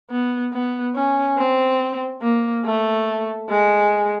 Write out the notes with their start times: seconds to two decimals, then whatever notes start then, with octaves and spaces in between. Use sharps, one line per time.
0.10 B3
0.53 B3
0.95 C#4
1.37 C4
2.22 A#3
2.65 A3
3.49 G#3